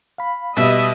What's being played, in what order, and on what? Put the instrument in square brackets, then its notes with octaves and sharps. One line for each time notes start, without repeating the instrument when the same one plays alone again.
[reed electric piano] F5 B5
[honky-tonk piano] B2 G3 [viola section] D#5 [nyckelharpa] E5